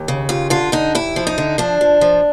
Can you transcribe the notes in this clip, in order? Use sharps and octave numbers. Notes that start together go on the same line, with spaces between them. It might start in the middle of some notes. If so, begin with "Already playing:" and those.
Already playing: D#2
C#3
D#2 F4
D3 F4
D3 D#4
D#2 E4
F3
D#4
D3
F3 D4
F3
F3